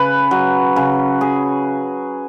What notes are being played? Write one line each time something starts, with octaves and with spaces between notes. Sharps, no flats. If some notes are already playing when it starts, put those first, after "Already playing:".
Already playing: C#3 B4
F#3
C#3
F#3 G#4